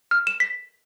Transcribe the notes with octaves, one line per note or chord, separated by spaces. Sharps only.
F6
E7
B6